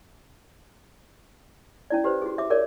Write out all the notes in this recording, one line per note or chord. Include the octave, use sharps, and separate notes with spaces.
C#4 E4 D5
G4 B4 C5
F#4 G#4
E5 D6
G#4 A#4 C#5 D5